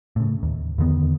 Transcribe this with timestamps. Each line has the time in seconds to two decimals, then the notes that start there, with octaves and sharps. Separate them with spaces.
0.16 A2 C#3
0.43 D#2
0.78 E2 D3 D#3 B3